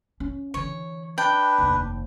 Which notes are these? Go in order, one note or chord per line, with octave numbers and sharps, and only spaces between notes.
C#4
D3 E3 C#5
D4 B4 G5
F1 D#2